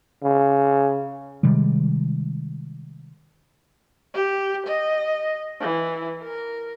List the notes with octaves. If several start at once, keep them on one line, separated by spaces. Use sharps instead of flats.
C#3
C3 D#3 G3 G#3
G4
D#5
E3
A#4